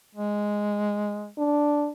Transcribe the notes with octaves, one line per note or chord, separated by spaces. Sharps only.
G#3
D4